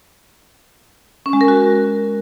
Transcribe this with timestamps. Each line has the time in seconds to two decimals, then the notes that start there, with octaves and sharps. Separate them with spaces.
1.26 C#4
1.33 G#3
1.41 A#4
1.48 F#4